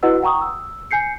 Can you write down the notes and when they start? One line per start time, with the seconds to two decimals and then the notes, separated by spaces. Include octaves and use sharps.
0.03 E4 F#4 B4 D#5 F#5 E6
0.22 F#5 G5 A#5 C#6 D#6
0.41 E6
0.91 G#5 G6 C7 C#7